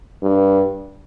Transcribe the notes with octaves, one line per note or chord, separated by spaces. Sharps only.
G2